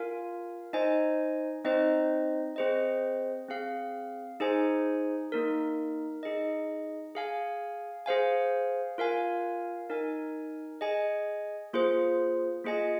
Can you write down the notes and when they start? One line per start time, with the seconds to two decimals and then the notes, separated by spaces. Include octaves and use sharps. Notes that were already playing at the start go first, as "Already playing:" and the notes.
Already playing: F4 A#4 F5 G#5
0.73 D#4 C5 D#5 G#5
1.65 C4 D#4 C5 D#5
2.56 C4 G#4 C5 D#5
3.48 C4 G#4 F5
4.40 D#4 G#4 C5 G#5
5.32 A#3 D#4 A#4
6.23 D#4 G#4 D#5
7.15 G#4 F5 G#5
8.06 G#4 C5 F5 G#5
8.98 F4 A#4 F5 G#5
9.90 D#4 A#4 G#5
10.81 G#4 D#5 G#5
11.73 A#3 F4 G#4 C5
12.64 A#3 F4 G#4 D#5 G#5